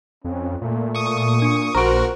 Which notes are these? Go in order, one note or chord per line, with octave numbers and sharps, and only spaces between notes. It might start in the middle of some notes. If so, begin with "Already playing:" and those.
F2 C#4
A#2 A3
C#6 D#6
D4 C#7
A#1 F#4 A#4 C5 A#5 C#6 D7